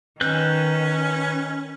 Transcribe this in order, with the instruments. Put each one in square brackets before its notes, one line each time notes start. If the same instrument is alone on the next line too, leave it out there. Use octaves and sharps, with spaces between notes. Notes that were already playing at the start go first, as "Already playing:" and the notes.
[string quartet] D#3 [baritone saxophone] C#4 [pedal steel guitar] B4 F#6 G6